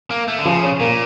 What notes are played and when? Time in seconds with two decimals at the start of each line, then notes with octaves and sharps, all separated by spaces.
0.11 A#3
0.28 A3
0.38 D3
0.45 C#3 F3
0.63 C#4
0.80 A#2 A#3